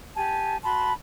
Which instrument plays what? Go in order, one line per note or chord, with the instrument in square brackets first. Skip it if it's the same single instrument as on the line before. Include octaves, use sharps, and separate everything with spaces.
[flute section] G4 G#5 A5
F#4 A5 B5 C6